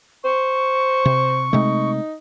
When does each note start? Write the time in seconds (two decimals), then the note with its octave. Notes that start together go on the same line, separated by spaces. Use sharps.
0.24 C5 C#6
1.05 C3
1.53 C3 G#3 A3 D#4